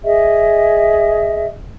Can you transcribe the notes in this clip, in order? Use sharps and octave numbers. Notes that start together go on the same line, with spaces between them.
G#4 D#5 E5